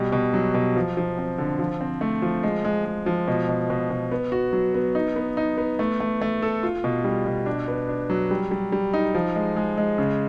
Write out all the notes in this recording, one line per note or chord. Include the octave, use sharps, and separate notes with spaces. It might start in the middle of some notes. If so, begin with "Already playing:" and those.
Already playing: B2 G3
B2
F#3
B2
F3
F3
C4
D3
F3
C4
A3
F3
G#3
G#3
G#3
F3
B2
B2
B2
B2
B3
F#4
F#3
B3
D#4
B3
D#4
B3
A3
A3
A3
A4
F4
B2
G3
B2
D4
B3
D4
F#3
G3
G3
G3
D#4
F3
G#3
G#3
G#3
C#3